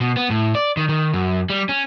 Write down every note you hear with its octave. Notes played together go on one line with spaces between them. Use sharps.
B2
B3
A2
D5
D#3
D#3
F#2
G3
C#4